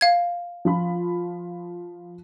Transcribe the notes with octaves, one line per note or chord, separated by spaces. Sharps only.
F5 G#6
F3 F4 B5